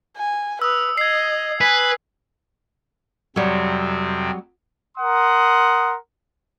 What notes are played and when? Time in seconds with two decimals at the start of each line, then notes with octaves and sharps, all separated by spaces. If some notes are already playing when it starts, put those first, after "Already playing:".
0.17 G#5
0.62 B4 D#6 E6
0.98 D#5 G#6 C7
1.61 B4 G#5
3.36 F2 C3 F#3 G3 C4
4.98 A#4 F#5 C6 D#6